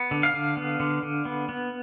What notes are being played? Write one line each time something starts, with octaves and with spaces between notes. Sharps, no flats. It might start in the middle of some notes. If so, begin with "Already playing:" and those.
Already playing: B3
D3
F5
D3
B3
D3
D3
B3
B3